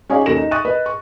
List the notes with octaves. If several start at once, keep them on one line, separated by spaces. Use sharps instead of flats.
C#4 D#4 G#4 C#5 D5 F5
D#2 C#4 A4 A#6 E7
D#4
E5 C#6 D#6 F#6 A6 D#7
B4 D#5
C#6